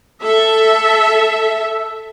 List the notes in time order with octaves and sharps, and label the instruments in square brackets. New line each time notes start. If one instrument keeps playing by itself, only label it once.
[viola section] A4 E5